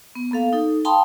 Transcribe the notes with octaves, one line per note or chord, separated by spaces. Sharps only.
B3
A#3 B3 A4 F5
D#4 A4
F5 G5 A5 B5 C6 D#6